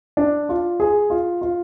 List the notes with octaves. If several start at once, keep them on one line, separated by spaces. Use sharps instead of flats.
D4
F4
G#4
F4
F4